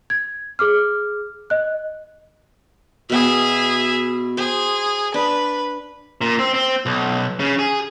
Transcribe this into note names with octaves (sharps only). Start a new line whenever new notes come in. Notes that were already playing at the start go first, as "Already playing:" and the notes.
G#6
G#4 D6 F6
D#5 F#6
B2 B3 G#4 E5
G#4 C5
D4 B4
A#2
C4
C4
B1
C#3
G#4